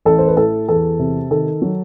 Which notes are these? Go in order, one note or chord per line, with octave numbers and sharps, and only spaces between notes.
A1 A4
C5
B4
A2 A4
E2 A4
C3
D#3 A4
F#3